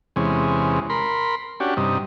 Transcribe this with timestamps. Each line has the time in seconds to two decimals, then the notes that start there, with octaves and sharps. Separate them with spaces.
0.16 E2 C3 G#3 C#4
0.90 A#4 B5 C6
1.60 C#4 D4 F#4 G4
1.77 G2 C3 D#4